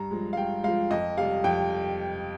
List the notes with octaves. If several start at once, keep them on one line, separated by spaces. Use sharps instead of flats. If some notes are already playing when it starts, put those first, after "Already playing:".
Already playing: G2 A#5
F3 G#3
F5
G2 G5
F3 G#3 F5
F2 D#5
C3 G3 F5
F2 G5